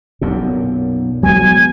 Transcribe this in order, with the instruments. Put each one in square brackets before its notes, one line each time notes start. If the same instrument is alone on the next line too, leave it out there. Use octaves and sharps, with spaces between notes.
[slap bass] B1 F#2 A#2
[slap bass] F#3 G#3 B3 [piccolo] G#5